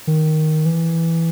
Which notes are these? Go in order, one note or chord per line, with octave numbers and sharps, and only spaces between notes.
D#3
E3